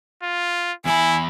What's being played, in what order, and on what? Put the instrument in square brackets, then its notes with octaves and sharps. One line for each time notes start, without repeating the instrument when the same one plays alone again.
[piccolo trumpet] F4
[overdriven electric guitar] E2 B5 [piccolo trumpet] E4 [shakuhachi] G#5